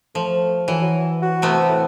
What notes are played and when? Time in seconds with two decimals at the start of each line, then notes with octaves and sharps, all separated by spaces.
0.15 F3 A3
0.68 E3 F#3
0.82 F#3
1.22 F#4
1.42 C3 A3 B3
1.69 A2